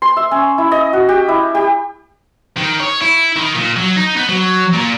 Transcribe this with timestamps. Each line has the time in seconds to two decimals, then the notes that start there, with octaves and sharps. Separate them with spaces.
0.02 C6
0.17 E5
0.31 C#4
0.58 E4
0.72 D#5
0.93 F#4
1.09 G4
1.29 E4
1.55 G4
2.57 D#3
2.80 C#5
3.02 E4
3.37 D#3
3.55 A#2
3.76 F#3
3.96 D#4
4.17 B3
4.29 F#3
4.74 A#2